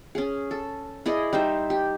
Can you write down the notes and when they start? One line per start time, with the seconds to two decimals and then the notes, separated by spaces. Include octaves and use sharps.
0.15 C#4 G#4
0.51 A4
1.06 E4 G#4 D5 D#5
1.33 G3 D#4 C5 E5
1.70 G4